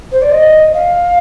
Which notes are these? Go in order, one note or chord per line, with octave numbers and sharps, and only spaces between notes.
C5
D5
D#5
F5